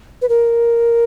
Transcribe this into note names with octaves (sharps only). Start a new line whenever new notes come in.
B4
A#4